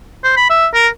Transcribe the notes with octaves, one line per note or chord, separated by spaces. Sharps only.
C5
B5
E5
A#4